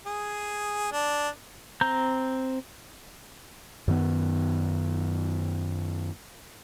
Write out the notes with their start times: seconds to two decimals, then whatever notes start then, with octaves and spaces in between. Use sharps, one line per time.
0.06 G#4
0.92 D4
1.81 C4 A#5 G6
3.88 F#2 D#3 B3